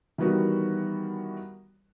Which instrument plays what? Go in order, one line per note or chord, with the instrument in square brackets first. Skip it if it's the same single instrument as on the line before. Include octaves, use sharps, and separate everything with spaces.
[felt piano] D#3 E3 G3 B3 F#4 A#4